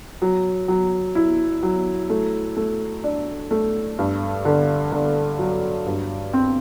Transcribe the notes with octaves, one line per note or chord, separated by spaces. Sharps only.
F#3
F#3
E4
F#3
A3
A3
D4
A3
G2
D3
D3
F#3
G2
C4